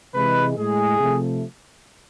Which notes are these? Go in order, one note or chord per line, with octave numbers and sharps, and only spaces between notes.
C3 E3 G#3 B4
A2 G#3 G#4
C3 F3 A3